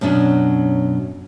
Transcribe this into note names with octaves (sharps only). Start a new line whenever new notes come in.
F#2 B2 F#3 C#4 D4